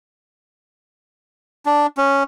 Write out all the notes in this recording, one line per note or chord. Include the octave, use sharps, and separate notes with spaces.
D4
C#4